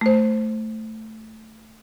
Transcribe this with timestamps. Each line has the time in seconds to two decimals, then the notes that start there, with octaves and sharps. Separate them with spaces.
0.01 A3 C5